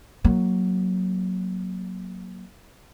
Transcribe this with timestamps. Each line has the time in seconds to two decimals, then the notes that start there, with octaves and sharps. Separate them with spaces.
0.24 F#3 A#3